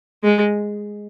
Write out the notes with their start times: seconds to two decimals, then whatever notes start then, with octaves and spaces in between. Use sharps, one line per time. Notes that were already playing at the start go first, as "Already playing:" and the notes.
0.24 G#3